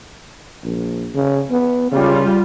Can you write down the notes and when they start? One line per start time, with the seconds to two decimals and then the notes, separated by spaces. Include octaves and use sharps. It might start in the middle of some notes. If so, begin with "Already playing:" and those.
0.63 A#1
1.14 C#3
1.51 B3
1.92 C#3 G3 F4